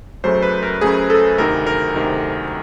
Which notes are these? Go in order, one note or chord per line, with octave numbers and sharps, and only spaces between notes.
F#2 C#3 F#3 A3 C5
B4
A#4
F#2 C#3 F#3 A3 G#4
A4
D2 C3 D#3 A#4
A#4
D2 C3 D#3